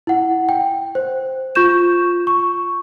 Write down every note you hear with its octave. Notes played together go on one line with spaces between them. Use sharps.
E4 F#5
G5
C5
F4 C#6 G6 E7
C#6